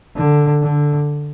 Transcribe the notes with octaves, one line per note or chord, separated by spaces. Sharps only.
D3
D3